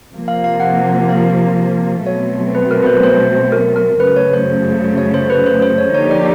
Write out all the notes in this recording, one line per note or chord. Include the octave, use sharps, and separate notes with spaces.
C3 F3 A#3
F5
F5
F#5
F5
B2 F#3 A3 C4 C#5
B4
A#4
B4
C5
C5
A#4
A#4
F#2 C#3 F#3 A3 B4
C#5
C5
C#5
C5
B4
C5
C5
C#5
D3 F3 A#3 D#4 G4 C#5
D5